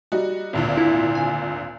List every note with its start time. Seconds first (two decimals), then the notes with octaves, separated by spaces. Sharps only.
0.12 G3 D#4 F#4
0.53 G#1 D2 A#2
0.77 E4
1.15 G#5